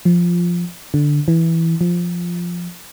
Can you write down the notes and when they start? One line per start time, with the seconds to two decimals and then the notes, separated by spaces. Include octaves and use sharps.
0.05 F3
0.94 D3
1.28 E3
1.81 F3